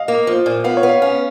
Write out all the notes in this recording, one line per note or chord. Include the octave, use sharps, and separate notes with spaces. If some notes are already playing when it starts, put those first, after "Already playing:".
Already playing: D#5 F5
A#3
F3
A#2
B3 F5
C#5
B3
F5
C#4 F5